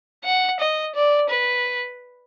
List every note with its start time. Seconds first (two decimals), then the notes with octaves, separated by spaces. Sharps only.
0.24 F#5
0.60 D#5
0.95 D5
1.29 B4